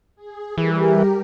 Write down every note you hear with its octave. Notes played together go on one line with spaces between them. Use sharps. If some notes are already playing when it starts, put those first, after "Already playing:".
G#4
E3 G3 G4 A#4